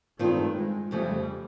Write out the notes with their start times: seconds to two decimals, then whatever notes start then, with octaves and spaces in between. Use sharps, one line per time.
0.19 G2 D#3 G#3 A3 C4 F4
0.56 G#3
0.91 F2 C#3 F3 G3 A3